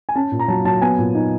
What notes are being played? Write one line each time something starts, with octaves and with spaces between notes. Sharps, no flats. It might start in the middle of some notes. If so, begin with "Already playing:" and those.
G#5
C#4 A5
A#2
A#5
F#3 A5
F#3 A5
B3 G#5
A#2
D#4